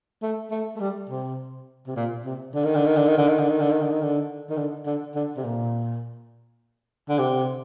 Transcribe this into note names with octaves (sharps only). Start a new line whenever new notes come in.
A3
A3
A3
G3
C3
C3
A#2
C3
D3
D#3
D3
D#3
D3
D#3
D3
D#3
D3
D#3
D3
D#3
D3
D#3
D3
D#3
D3
D3
D3
C3
A#2
D3
C3